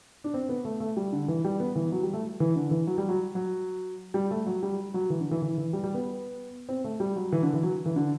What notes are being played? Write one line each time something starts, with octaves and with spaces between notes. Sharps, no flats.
D4
C4
B3
A3
A3
G3
D3
E3
G3
B3
E3
F#3
G3
A3
E3
D3
E3
F#3
G3
F#3
F#3
G3
A3
F#3
G3
F#3
E3
D3
E3
E3
E3
G3
G3
B3
C4
A3
G3
F#3
E3
D3
E3
F#3
E3
D3